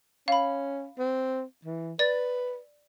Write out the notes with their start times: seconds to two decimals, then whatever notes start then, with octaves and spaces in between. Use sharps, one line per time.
0.28 C#4 F5 B5
0.99 C4
1.65 E3
1.99 B4 D5 A6